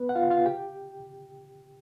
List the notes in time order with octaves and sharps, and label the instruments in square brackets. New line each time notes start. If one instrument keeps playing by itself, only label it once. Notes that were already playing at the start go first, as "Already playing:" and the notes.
Already playing: [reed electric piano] B3 B4
F#5
F4 F5
F4 F5
G4 G5